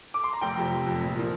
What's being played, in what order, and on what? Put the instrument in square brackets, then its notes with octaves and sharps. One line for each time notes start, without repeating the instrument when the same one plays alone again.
[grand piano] D6
C6
A#5
F1 G5
F2 C3
F1
F2 C3
A#1
A#2 F3